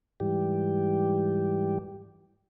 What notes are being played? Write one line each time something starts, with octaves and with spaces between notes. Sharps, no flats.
G#2 E3 G3 G4